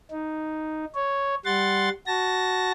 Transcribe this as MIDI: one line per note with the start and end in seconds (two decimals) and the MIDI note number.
0.11 0.85 63
0.95 1.35 73
1.45 1.89 55
1.45 1.89 78
1.45 1.89 84
1.45 1.89 93
2.07 2.72 66
2.07 2.72 81
2.07 2.72 94